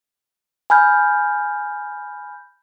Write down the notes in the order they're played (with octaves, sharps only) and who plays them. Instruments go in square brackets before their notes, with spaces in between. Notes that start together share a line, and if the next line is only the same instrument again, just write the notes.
[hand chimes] G#5 B5 F6 G6